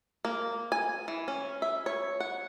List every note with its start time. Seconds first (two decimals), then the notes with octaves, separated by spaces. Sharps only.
0.25 A#3
0.72 G#5
1.08 E3
1.28 C#4
1.62 E5
1.86 C#5
2.20 F#5